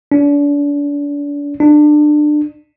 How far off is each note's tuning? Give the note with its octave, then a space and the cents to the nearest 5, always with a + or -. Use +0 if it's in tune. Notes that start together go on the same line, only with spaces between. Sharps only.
D4 -35
D4 +25